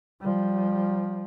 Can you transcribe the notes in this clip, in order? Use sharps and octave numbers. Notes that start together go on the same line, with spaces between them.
F3 G3